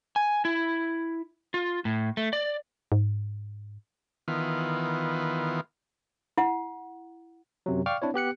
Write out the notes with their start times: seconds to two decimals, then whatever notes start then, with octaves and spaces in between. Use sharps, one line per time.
0.16 G#5
0.45 E4
1.54 F4
1.85 A2
2.17 A3
2.33 D5
2.92 G#2
4.28 D#3 E3 B3 F4
6.38 E4 F#5
7.66 F#2 C3 F#3
7.86 D5 F5 G5 C#6 D6 F6
8.02 C4 D4 E4 C#5
8.14 B3 G4 F#6 C#7